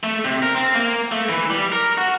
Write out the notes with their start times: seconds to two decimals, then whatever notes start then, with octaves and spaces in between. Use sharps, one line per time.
0.03 A3
0.25 C3
0.43 A#4
0.55 C4
0.74 A#3
1.12 A3
1.29 E3
1.50 G3
1.72 A#4
1.98 F#4